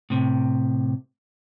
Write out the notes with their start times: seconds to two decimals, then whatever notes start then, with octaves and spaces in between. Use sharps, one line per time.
0.10 A2 C3